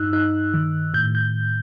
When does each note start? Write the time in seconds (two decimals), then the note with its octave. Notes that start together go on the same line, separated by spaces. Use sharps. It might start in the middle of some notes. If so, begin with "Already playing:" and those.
Already playing: G2 D#4 E6 F#6
0.13 D#4 F#6
0.54 D#3
0.94 A2 G6
1.15 G6